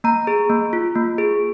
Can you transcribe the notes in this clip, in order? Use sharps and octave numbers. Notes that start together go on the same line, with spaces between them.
A#3 A#5
G#4
A#3
F4
A#3
G#4